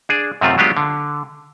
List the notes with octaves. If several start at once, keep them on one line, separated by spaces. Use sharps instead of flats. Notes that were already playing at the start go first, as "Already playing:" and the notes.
D4 G#4
F#2 C3 D#3 A3 C4 F4
F#3 G#3 B3 D4 F4 G4
D3